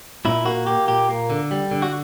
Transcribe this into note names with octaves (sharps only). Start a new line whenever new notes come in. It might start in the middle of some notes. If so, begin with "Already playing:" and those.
A#2 E4
A#3 F#4
A#3 G4
A#2 G4
A#3
D3
G3
D3
F#4